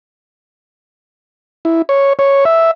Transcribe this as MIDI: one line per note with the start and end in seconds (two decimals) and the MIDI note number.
1.65 1.82 64
1.89 2.13 73
2.19 2.45 73
2.45 2.71 76